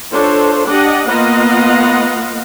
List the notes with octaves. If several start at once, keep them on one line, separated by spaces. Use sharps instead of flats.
D4 F4 A4 C5 C#5
D4 G4 D5 D#5 F#5
A#3 B3 F4 D#5 F5 F#5